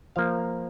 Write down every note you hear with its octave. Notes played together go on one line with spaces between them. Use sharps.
F3 A#3 F5